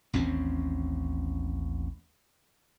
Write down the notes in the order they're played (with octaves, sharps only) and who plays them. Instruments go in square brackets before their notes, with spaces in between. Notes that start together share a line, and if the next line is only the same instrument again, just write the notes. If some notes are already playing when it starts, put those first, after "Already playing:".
[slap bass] A1 D#2 C4 C#4